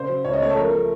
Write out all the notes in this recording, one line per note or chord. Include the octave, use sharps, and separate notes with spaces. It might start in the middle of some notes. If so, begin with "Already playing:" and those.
Already playing: C#3 C5
F#3
C#2 C#5
D#5
A3 C#5
A4
F3 A#4
A3